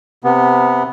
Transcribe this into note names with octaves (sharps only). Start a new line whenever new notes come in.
C3 B3